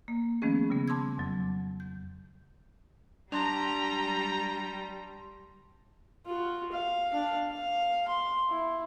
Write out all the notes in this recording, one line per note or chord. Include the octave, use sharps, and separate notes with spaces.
A#3
D#3 F3 A3 B3 C#4 G#4
C#3 G3 B3
A5 C6 D6 E6 G#6
F2 F#3
G6
G3 D4 G5 A5 A#5 C6 F7
F4 F#4
F5
D4 F5
F5
C6
E4